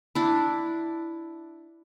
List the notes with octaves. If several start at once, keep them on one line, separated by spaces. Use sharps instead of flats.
D4 E4